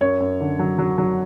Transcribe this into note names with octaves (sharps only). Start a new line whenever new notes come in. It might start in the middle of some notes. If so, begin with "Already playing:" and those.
F#2 C#5
F#2
D3
F#3
F#3
F#3